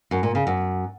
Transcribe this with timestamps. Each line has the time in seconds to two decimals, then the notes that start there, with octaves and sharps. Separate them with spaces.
0.11 F#2
0.23 A#2
0.35 C#3
0.47 F#2